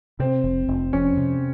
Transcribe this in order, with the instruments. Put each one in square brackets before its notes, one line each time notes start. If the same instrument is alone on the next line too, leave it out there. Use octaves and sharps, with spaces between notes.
[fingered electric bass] C3 [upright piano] C4
[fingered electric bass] F1
F1
[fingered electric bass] F2 [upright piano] C#4
[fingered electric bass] C3